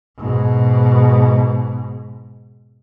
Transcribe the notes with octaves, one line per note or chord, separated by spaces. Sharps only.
G#2 B2